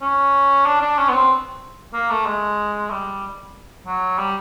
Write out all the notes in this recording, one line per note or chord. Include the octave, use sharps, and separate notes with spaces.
C#4
D4
D4
C#4
B3
C4
A#3
A3
G#3
G3
F#3
G3